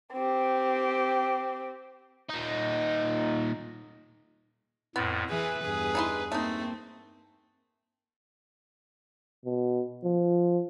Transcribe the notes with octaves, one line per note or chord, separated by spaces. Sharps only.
C4 G4
A#2 D#4
F2 A2 B3
E3 G#4 B4
E2 G2 G#4
D#4 E4 C6
A3 A#3 C4 D#4
B2
F3